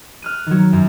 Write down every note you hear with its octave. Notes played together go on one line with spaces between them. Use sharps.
F6 F#6 D#7
D#3 F#3
F#2